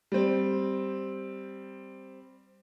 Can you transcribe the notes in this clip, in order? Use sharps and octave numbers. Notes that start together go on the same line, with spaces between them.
G3 C4